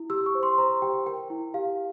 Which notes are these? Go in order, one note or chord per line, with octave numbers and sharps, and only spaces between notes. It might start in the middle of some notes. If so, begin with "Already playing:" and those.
Already playing: E4
G4 E6
C#6
C5
C6
C5 A#5
G4 G5
A#4 G5
E4
G4 F5